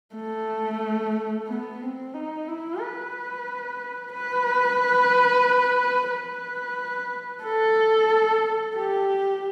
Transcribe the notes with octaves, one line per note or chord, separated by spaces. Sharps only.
A3
B3
C4
D#4
E4
B4
B4
B4
A4
G4